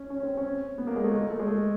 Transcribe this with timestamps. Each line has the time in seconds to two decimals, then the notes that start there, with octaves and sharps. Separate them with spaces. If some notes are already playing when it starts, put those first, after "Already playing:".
Already playing: C#4
0.10 C#4
0.23 C4
0.37 C#4
0.78 B3
0.87 A#3
0.96 G#3
1.04 A3
1.13 A#3
1.21 G#3
1.30 A3
1.39 G#3
1.47 A3